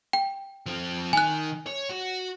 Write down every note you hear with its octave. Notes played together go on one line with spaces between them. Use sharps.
G5
F3 C4
D#3 G#5 F#6
C#5
F#4